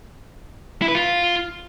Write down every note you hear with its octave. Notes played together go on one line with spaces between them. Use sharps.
E4
B4
F4